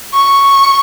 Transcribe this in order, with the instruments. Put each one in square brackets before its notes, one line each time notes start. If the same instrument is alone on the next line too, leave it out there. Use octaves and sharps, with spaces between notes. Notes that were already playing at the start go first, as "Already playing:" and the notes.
[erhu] C#6